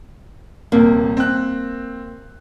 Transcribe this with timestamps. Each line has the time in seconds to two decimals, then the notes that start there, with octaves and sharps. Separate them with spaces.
0.72 D#1 C3 A#3
1.17 C4 F#6